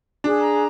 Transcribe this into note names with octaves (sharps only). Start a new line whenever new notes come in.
D4 G#4
A#5